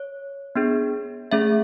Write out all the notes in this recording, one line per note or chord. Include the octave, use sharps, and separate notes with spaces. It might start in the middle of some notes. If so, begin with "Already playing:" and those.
Already playing: C#5
B3 D4 G#4
A3 C#4 G#4 E5